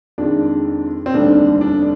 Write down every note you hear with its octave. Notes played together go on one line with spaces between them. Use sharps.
F2 D#3 G#3 D4
C4
F1 D#2 D3 G3 D4
D4